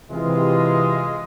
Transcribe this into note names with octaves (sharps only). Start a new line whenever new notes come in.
C3 E3 G#3 F4 D#5